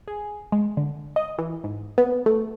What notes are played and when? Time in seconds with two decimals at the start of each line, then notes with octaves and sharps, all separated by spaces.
0.08 G#4
0.52 G#3
0.77 D3
1.16 D#5
1.38 E3
1.64 G#2
1.98 B3
2.26 A3